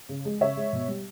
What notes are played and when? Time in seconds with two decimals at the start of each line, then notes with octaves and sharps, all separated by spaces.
0.09 C#3
0.25 G#3
0.41 C#3 C#5 E5
0.57 G#3
0.73 B2
0.88 G3